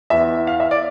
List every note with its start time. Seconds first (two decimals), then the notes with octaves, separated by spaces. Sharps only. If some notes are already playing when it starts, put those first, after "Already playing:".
0.10 E2 E3 E5
0.47 F5
0.60 E5
0.71 D5